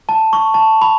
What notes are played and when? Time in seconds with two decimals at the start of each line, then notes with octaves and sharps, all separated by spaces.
0.09 A5
0.33 C#6
0.54 A5
0.82 B5